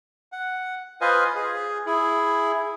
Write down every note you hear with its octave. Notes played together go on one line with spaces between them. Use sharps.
F#5
F4 B4 C5 D#5 F5 G#5
G#4
E4 G#4